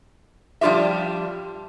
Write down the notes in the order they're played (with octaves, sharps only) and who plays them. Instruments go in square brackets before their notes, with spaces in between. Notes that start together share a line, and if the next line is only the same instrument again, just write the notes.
[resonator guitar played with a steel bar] F3 G3 D4 F4 G4 E5